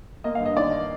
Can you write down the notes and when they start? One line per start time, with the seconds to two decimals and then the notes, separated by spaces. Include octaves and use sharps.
0.24 A#3 D#5
0.35 F5
0.40 G2
0.45 D#5
0.57 D#3 D5